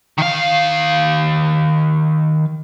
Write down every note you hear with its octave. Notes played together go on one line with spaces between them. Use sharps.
D#3 F5